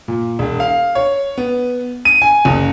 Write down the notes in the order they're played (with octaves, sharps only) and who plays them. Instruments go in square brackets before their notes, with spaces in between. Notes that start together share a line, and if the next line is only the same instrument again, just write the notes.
[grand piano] A#2
E1
F5
C#5
B3
D#7
G#5
F#1